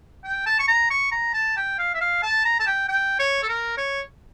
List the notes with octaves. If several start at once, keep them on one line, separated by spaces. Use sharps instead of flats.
G5
A5
C#6
A#5
C#6
A#5
A5
G5
F5
E5
F5
A5
A#5
A5
G5
G5
C#5
A4
A#4
C#5